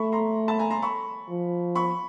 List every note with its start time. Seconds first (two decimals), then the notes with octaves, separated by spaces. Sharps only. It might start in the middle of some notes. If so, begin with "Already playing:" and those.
Already playing: A3 B5 C#6
0.12 A#5 C6
0.48 A5 B5
0.59 G#5 A#5
0.70 A#5 C6
0.82 B5 C#6
1.29 F3
1.75 B5 C#6